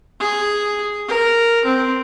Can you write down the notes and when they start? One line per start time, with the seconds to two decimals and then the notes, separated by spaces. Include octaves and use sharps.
0.20 G#4
1.08 A#4
1.65 C4